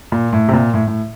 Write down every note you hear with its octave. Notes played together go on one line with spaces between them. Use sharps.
A#2
A2
C3
A#2
A2
A2